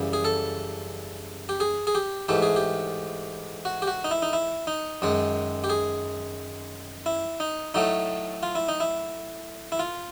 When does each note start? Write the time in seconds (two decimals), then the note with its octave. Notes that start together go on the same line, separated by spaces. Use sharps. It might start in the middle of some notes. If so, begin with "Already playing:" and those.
Already playing: F#2 C#3 E3 G3
0.13 G#4
0.25 A4
1.49 G4
1.60 G#4
1.87 G#4
1.95 G4
2.29 G#2 E3 A3 G4
2.42 G#4
2.56 G4
3.65 F#4
3.82 G4
3.87 F#4
4.04 D#4
4.11 E4
4.22 D#4
4.33 E4
4.67 D#4
5.02 F#2 D#3 G#3
5.64 G4
5.70 G#4
7.06 E4
7.40 D#4
7.74 A2 F#3 A3 D#4
8.43 F4
8.55 E4
8.69 D#4
8.80 E4
9.72 E4
9.79 F4